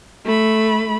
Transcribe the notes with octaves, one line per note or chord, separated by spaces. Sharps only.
A3 B5